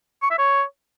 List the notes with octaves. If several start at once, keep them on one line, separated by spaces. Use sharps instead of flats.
C#6
E5
C#5